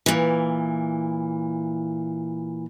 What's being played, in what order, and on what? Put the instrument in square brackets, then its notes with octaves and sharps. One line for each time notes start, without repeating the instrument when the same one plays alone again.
[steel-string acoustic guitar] A#2 E3